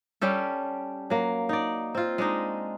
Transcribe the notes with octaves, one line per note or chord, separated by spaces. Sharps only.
G3 C#4 G4 A4
F#3 A#3
D#4 D5
C4 F4
G#3 D4 D#4